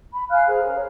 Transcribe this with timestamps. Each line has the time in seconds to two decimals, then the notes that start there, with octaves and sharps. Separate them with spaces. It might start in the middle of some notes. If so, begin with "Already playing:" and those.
0.12 B5
0.30 F5 G#5 F6 F#6
0.47 G#4 A#4 C5 A#5
0.62 C#4 A#4
0.76 C#5